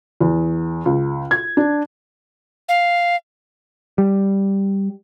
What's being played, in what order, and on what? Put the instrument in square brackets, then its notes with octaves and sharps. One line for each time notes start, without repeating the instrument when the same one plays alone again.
[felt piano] E2
C#2
G#6
D4
[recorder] F5
[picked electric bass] G3